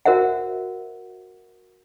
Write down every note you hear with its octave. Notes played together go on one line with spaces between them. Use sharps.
F#4 A#4 C5 E5 F#5